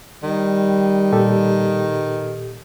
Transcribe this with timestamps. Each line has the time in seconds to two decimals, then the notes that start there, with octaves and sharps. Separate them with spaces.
0.23 D#3 G3
1.12 A#2 G4 A4